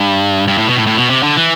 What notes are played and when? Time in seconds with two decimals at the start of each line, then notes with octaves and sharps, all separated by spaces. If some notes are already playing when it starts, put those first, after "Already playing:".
Already playing: G2
0.48 G2
0.58 A2
0.67 B2
0.77 A2
0.87 A2
0.98 B2
1.10 C3
1.23 D3
1.37 E3